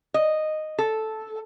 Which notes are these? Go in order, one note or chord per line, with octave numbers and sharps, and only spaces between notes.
D#5
A4